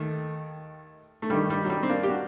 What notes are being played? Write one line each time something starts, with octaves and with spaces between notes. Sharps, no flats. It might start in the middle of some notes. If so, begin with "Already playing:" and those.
Already playing: D#2 D#3 A3
A3
G2 D#3 G3
G3
F#3
G3
C4
A#3 D4
G4
D4 F#4